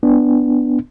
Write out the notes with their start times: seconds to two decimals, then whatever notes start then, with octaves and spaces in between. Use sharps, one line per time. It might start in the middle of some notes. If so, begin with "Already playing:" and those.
0.03 B3 D4